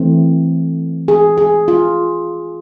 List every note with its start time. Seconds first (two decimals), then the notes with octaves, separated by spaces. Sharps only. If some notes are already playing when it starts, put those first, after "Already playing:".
Already playing: E3 A3 C4
1.08 G#4
1.38 G#4
1.68 F4